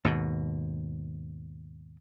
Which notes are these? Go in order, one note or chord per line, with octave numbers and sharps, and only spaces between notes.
D#2 G#2 B2